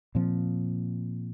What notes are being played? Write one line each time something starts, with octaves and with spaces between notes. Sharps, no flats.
A#2 F3 C4